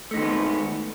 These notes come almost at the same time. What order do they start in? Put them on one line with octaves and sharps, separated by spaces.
A3 D#4 D#3 G#3 B3